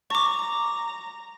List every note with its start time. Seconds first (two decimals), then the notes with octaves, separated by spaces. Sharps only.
0.10 A#5 C#6 D6